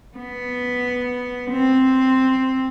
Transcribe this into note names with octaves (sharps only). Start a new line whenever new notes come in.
B3
C4